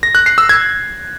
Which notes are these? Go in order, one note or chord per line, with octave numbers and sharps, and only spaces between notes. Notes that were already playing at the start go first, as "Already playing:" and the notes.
A#6
F#6
C7
E6
G#6